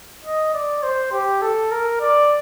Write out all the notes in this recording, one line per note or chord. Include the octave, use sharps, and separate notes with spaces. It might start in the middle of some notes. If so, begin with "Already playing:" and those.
D#5
D5
C5
G4
A4
A#4
D5